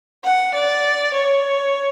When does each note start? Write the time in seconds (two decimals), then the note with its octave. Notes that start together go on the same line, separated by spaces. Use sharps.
0.24 F#5
0.54 D5
1.13 C#5